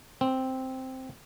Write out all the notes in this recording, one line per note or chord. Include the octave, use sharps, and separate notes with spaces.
C4